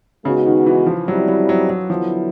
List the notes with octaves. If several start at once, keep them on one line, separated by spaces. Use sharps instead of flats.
C#3 G#3 B3 D#4 F#4
D#3
E3
F3
F#3 G3 C4 E4
F#3
F#3
F#3
D3 F3 F#3 B3 E4